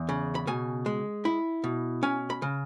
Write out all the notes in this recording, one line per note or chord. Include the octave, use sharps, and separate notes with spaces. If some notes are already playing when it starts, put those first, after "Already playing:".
Already playing: E2
C#3
B5
B2 G#5
G#3
E4
B2
C#4 G#5
B5
C#3